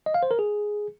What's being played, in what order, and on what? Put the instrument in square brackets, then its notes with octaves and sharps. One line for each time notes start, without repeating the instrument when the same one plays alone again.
[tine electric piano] D#5
F5
C5
A#4
G#4